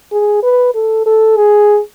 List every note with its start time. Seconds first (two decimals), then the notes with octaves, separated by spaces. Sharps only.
0.12 G#4
0.43 B4
0.75 A4
1.06 A4
1.37 G#4